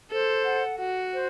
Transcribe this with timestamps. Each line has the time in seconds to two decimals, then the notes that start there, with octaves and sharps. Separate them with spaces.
0.11 A4 C5
0.45 F#5
0.79 F#4 F#5
1.13 C5